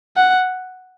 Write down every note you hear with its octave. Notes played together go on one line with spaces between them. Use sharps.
F#5